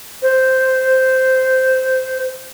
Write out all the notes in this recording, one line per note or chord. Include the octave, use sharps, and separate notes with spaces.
C5